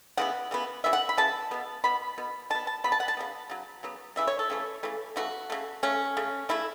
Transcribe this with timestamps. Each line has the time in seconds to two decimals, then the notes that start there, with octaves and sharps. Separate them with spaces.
0.17 C#3 E3 B3 F#5
0.51 C#3 E3 B3
0.84 C#3 E3 B3 E5
0.93 F#5
1.09 B5
1.18 C#3 E3 A5
1.51 B2 B3
1.84 B2 B3 B5
2.18 B2 B3
2.50 B2 B3 A5
2.67 A5
2.84 C#3 F#3 B3 B5
2.92 A5
3.00 F#5
3.08 A5
3.17 C#3 F#3 B3
3.50 C#3 F#3
3.83 C#3 F#3 B3
4.16 C#3 E3 A3 E5
4.27 C#5
4.39 A4
4.50 C#3 E3 A3
4.83 C#3 E3 A3
5.16 C#3 E3 A3 F#4
5.50 C#3 A3
5.83 C#3 A3 C#4
6.17 C#3 A3
6.49 C#3 A3 E4